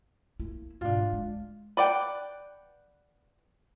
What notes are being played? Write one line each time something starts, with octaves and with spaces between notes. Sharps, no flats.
A#3 E4
G#2 B2 D4 F4
D3 A#3
G#3
B4 D5 F#5 G5